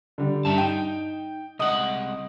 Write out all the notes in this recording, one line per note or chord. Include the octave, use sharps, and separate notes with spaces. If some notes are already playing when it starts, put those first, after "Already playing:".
D3 G3
G2 A#4 E5 A5
D#4 G5
C2 G#3 D#5 F#5 D#6